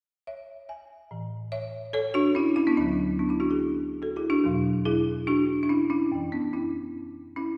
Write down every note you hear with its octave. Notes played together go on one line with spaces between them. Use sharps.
C#5 E5
E5 G#5
A2 E3
C#5 E5
A4 C#5
D4 F#4
C#4 E4
C#4 E4
B3 D4
D2 D3 F#3 C#4 E4
B3 D4
C#4 E4
D4 F#4
E4 G#4
F#4 A4
E4 G#4
D4 F#4
E2 B2 F#3
E4 G#4
D4 F#4
D4
C#4 E4
C#4 E4
F#2 E3
B3 D4
C#4 E4
C#4 E4